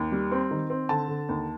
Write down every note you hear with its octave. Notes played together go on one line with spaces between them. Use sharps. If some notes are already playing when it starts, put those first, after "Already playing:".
Already playing: D#2
G3
C4
D#3
C4
D3 A5
D3
D#2